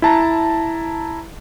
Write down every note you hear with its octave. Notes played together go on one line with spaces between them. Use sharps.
E4 A5 A#5